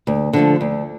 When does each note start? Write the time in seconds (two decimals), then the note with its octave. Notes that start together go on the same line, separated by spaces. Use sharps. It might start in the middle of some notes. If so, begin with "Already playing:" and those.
0.07 D2
0.33 D3 F3 A3
0.61 D2